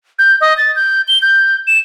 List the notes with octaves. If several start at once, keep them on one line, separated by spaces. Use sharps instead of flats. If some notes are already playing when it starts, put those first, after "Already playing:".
G6
D#5
A6
G6
G7
G6
E7